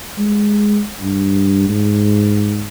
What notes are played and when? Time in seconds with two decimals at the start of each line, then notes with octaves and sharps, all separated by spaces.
0.18 G#3
1.01 G2
1.69 G#2